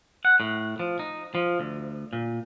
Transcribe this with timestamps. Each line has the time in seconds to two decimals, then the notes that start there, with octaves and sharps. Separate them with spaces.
0.25 F#5
0.40 A2
0.80 F3
0.99 D#4
1.35 F3
1.60 D2
2.13 A#2